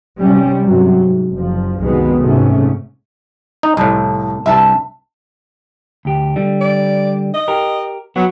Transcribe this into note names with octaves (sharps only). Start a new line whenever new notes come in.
C3 G3 C#4
G2 C3 F#3
G#2
F#1 F3
C2 F#2 B2 D#3 G#3 B3
G#2 C3 A3 C#4
D#4
C2 F2 A2
C2 G2 E5 A5
D2 G4
D3 G3
D5
D#5
G4 A#4
F#3 B3 F#4